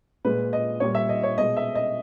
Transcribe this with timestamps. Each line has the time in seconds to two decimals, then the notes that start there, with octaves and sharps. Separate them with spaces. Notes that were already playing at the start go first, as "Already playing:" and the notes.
0.25 A#2 G#3 B4
0.53 D#5
0.80 A#2 G3 C#5
0.95 E5
1.09 D#5
1.23 C#5
1.38 B2 G#3 D#5
1.57 E5
1.75 D#5